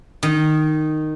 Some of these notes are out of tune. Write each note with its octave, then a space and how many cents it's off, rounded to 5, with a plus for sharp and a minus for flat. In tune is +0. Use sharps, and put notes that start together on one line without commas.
D#3 -10